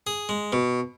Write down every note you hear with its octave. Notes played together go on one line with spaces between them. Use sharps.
G#4
G#3
B2